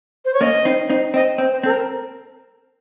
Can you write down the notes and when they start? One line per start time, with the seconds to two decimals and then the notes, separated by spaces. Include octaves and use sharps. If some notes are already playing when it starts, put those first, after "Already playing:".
0.25 C5
0.33 C#5
0.41 A#3 C#4 D#5
0.65 C4 D#4
0.90 C4 D#4
1.14 C4 D#5
1.38 C4
1.51 C5
1.63 C4 A4
1.70 A#4